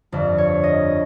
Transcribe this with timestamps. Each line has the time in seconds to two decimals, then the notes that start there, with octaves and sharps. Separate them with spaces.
0.12 G1 F2 D3
0.38 C#5
0.64 D#5